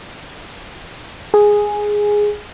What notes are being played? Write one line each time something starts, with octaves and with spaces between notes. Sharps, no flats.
G#4